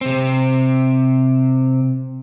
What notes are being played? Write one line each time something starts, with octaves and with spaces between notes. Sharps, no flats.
C3 C4